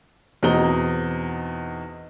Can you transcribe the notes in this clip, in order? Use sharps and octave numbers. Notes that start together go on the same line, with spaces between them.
E2 B2 C4 D#4 A#5 G7